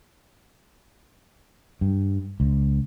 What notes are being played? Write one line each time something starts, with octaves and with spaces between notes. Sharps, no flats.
G2
C#2